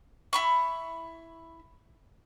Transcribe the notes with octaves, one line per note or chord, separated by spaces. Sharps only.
E4 B5 C#6